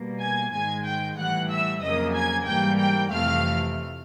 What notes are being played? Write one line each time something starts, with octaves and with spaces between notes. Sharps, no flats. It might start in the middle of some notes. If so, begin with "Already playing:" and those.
Already playing: B2 G3 A#3
G#5 G#6
G#2 D#3 G#3 G#5 G#6
G5 G6
A2 E3 G3 F#5 F#6
E5 E6
F2 C#3 F#3 A#3 D#5 D#6
G#5 G#6
G#2 E3 G3 A#3 G5 G6
G5 G6
F2 C3 E3 A3 F5 F6